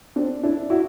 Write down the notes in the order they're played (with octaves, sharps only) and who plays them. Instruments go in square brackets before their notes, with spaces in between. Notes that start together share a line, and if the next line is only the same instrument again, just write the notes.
[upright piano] C4 D4
D4 E4
E4 F#4